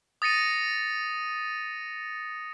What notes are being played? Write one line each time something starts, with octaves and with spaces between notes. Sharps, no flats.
D#6 A6 A#6 C#7 D#7